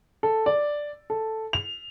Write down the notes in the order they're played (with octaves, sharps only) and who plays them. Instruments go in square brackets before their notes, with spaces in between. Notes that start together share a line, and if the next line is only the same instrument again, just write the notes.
[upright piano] A4
D5
A4
F7